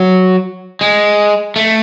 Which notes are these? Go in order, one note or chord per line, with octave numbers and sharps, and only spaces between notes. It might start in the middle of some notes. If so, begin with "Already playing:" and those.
Already playing: F#3
G#3
A3